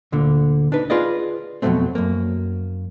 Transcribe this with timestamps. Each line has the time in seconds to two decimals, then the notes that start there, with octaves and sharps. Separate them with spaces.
0.12 D2 A#2 D3
0.72 D4 D#4 B4
0.90 F4 G#4 B4 D5 D#5
1.62 F2 B2 D#3 F#3 A3 C4
1.95 F#2 A#3